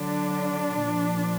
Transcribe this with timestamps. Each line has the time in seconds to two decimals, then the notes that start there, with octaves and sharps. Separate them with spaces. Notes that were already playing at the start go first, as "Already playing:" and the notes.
Already playing: D3 F#3 D4
0.80 A#2 F3